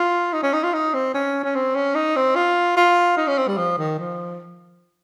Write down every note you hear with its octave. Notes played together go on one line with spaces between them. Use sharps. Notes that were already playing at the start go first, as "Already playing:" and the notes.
Already playing: F4
D#4
C#4
D#4
F4
D#4
C4
C#4
C#4
C4
C#4
D#4
C4
F4
F4
D#4
C#4
C4
G3
F3
D#3
F3